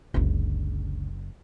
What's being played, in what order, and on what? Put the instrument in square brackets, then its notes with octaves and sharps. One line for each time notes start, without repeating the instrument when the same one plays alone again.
[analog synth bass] F#1 [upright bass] C#2 D3